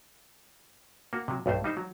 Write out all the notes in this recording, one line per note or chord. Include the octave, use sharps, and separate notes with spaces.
A#3 F#4
C3 F#3
B1 G2 A3 C5
G3 D#4 C5
F#3